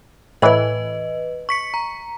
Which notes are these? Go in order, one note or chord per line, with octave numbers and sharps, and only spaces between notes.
A2 E3 B4 D#5
C#6 B6 C#7
A#5